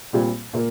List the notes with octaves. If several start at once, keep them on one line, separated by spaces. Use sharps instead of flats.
A#2 G3 C4 F4
A#2 A#3 F4